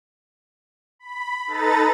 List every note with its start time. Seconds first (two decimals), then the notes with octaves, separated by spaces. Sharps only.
0.99 B5
1.47 D#4 A4 B4 A#5 A6